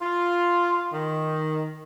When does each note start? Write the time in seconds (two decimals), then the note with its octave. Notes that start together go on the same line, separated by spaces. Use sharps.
0.02 F4
0.93 D#3